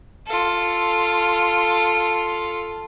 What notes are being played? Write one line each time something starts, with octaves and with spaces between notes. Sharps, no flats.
F4 A4